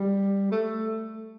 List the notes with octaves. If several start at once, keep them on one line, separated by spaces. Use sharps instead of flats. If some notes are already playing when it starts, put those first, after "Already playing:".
Already playing: G3
A3